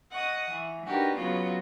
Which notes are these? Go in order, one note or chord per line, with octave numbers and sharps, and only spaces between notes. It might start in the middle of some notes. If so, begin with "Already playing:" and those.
D#5 F#5 C#6 D#6
E3
D4 D#4 F#4 G4 A#4 B4
C#3 F#3 B3 F4 F#4 B4